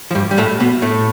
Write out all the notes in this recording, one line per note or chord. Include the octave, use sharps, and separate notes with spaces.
F3
G2 G3
G3
A2 A3
B2 B3
A2 A3